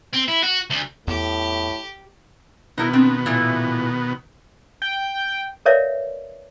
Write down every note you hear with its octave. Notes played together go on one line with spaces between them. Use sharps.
C4
E4
F#4
D2
E2 A2 G4
B2 D#3 B3 D#4 E4 A#4
C4 D4
A#2 E3 A3
G5
A#4 B4 C#5 D5 E5 F5